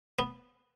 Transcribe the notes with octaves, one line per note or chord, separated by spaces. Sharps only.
B3